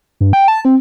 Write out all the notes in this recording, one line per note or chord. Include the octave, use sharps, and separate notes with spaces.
G2
G5
A5
C4